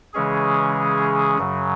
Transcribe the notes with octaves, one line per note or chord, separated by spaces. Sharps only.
C#3 E3 G#3 C#4 G#4
F#2 C#3 F#3